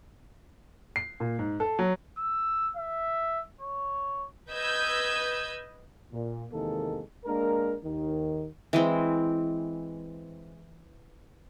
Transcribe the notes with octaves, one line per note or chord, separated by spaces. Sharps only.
C7
A#2
G#2
A4
F#3
E6
E5
C#5
B4 D#5 D#6 E6 G6 G#6
A#2
E2 C3 D#3 G#3 A#3 A4
G#3 A#3 D4 A#4
D#2 D#3
E3 G#3 C4